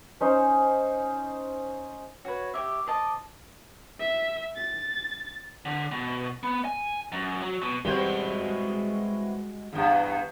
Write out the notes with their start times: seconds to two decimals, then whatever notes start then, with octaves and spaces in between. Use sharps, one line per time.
0.20 C#4 D#4 C5
2.25 F#4 B4 C#5
2.54 G4 C#5 E5 D6
2.87 C5 D#5 A5
4.00 E5
4.56 A6
5.65 D3
5.92 B2
6.43 B3
6.65 G#5
7.12 F#2
7.42 F#3
7.62 B2
7.85 E3 G3 G#3 C4 F#4
9.73 E2 G2